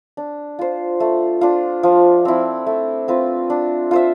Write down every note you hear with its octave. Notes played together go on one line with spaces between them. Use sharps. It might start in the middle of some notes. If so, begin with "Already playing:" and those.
D4
F4 C5
A3
D4 F4
F3
C4 E4
A3
C4 F4 B4
D4
F4 C5 E5